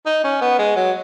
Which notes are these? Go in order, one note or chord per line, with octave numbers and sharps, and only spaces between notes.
D#4
C#4
B3
G#3
F#3